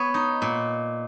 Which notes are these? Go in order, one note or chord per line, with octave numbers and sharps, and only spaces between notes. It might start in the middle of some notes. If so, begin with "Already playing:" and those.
Already playing: B3 C#5
D#4
A#2